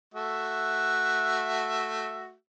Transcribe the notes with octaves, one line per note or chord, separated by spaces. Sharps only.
A3 F#4 E5